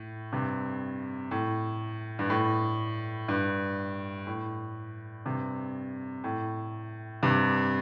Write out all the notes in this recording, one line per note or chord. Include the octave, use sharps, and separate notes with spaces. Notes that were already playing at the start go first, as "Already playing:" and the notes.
Already playing: A2
G2 C3
A2
G2
A2
G2
A2
G2 C3
A2
G2 C3